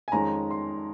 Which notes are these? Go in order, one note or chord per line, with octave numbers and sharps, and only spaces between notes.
G#5
F2 D#3 G#3 C#4 A#5
C6